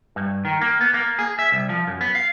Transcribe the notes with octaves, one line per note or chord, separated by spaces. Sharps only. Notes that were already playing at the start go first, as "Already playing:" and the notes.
G2
D#3
A#3
B3
A#3
G#4
E5
C2
F3
F#2
B3
F5